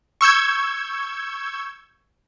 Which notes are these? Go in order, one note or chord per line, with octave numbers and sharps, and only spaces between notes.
C#6 E6 G6 G#6